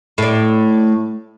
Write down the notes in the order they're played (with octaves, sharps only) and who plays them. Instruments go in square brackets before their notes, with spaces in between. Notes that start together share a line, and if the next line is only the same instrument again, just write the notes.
[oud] A2 D5